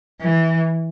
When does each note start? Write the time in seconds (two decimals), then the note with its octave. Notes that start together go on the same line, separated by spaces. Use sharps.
0.21 E3